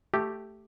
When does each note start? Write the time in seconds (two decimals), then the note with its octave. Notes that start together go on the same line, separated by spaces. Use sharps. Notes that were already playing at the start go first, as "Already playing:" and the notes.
0.14 A3 G4